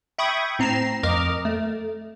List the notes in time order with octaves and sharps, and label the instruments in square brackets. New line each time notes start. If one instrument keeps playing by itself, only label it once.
[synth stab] E5 G5 B5 C#6 D#6 G#6
A2 C4 A#5 C7 E7
F2 A#4 D#5 D6 F6
A3